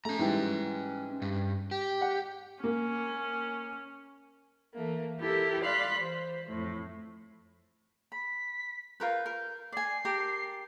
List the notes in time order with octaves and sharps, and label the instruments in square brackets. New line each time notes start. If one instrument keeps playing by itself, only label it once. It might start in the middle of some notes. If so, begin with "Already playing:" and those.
[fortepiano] A3 [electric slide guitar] C#4 A#5
[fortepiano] G#2 E3 G3
[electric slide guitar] G2
G4
[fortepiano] F#5
[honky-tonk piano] A#3 [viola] C#4
[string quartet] E3 A3 A#3
E4 G4 A4 A#4
D5 F5 B5 C6 F#6
E3 C5
F2 A2
[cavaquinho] B5 [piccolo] B6
[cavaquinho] F4 A#4 B4 [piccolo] G6
[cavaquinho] A#4
[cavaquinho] D5 G#5 [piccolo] C7
[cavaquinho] G4 A#4 A5